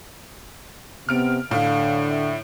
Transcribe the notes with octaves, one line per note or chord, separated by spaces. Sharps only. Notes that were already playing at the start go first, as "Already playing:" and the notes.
C3 B3 F6 D7
A2 D3 F5
E5